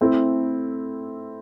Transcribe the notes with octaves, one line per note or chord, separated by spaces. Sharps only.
A3 C4 E4 A4